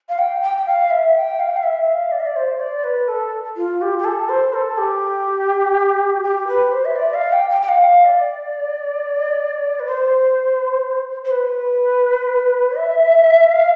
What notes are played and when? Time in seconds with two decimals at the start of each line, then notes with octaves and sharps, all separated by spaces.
0.08 F5
0.18 G5
0.41 G5
0.57 G5
0.65 F5
0.90 E5
1.15 G5
1.39 F5
1.49 G5
1.56 F5
1.63 E5
1.86 F5
2.11 D5
2.19 E5
2.26 D5
2.35 C5
2.59 D5
2.83 B4
3.07 A4
3.56 F4
3.81 G4
3.98 G4
4.04 A4
4.28 C5
4.53 A4
4.77 G4
6.22 G4
6.47 B4
6.71 C5
6.84 E5
6.95 D5
7.13 F5
7.32 G5
7.49 G5
7.61 G5
7.68 F5
8.04 D5
9.79 B4
9.85 C5
11.24 C5
11.30 B4
12.76 E5
13.49 F5